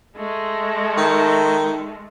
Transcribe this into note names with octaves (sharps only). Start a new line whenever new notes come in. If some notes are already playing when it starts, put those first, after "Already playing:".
G#3 A3
D#3